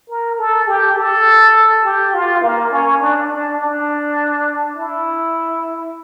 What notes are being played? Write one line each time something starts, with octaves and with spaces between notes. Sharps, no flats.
A#4
A4
G4
A4
G4
F4
A#3
C#4
D4
D4
D4
E4